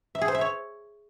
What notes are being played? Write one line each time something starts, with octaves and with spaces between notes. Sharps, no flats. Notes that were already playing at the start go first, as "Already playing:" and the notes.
E5
G#4
C5
E5
C#5